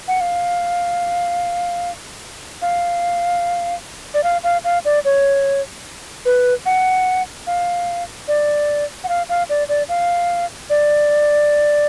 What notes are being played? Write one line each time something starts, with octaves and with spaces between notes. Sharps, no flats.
F#5
F5
F5
D5
F5
F5
F5
D5
C#5
B4
F#5
F5
D5
F#5
F5
F5
D5
D5
F5
D5